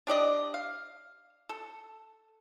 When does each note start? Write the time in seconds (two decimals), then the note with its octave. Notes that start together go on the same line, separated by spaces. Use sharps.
0.07 D4 G4 D5 D#5
0.54 F5
1.49 A4